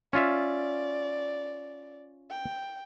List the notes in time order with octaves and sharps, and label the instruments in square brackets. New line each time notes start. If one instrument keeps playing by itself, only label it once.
[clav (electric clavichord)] C#4 F4 E5 [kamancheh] D5
[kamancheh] G5